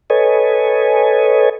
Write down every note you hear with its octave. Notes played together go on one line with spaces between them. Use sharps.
A4 B4 C#5 D#5 G#5